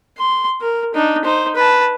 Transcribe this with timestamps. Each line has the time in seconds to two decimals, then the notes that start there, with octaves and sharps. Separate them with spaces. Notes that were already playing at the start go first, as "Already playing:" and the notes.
0.18 C6
0.61 A#4
0.95 D4 D#4
1.24 D#4 C5
1.56 B4 A5